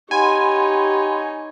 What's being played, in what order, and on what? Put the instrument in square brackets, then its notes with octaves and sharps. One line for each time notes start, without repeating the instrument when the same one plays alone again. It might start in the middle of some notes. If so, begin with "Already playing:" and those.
[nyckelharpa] D#4 C#5 [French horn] G4 [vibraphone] F#5 B5 C6 [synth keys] G#5